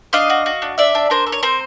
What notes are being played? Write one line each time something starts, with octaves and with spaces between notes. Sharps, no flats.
D4 D#5 F5
F#4
F#4
D4
D4 D5 E5
D4
D4 A#4 C5
A4
C#5
C4 A#4 C5